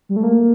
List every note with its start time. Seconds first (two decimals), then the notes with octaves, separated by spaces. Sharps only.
0.09 G3
0.16 A3
0.23 A#3